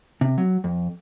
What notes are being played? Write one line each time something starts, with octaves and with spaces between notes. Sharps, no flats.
C3
F#3
F2